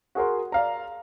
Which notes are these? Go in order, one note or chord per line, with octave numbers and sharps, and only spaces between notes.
F#4 G#4 A#4 C6
D5 F5 A#5